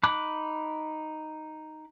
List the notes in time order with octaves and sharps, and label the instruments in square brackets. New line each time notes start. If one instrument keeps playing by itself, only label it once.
[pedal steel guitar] D#4 B5 D6 F#6